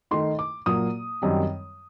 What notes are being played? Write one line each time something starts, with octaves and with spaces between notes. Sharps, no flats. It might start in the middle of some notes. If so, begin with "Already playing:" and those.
D#3 A3 D#4 C6
D6
A#2 F#3 A#3 D#6
F#2 D#3 G3 C4